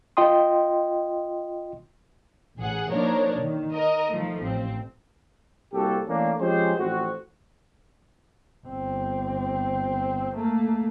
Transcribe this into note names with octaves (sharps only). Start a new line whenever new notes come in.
F4 D#5 G5 C6 D#6
A1 G#4 F#5
F3 A#3 D4 D#4 A#4 C#5
D#3
A#4 D#5
D#3 F3 A3
A1 C4
C2 A#3 F#4 G4 A4
E3 A3 A#3 C#4 D4
F3 G#3 C4 C#4 G4 C5
A1 F3 C4 F#4
G1 C4
A3 A#3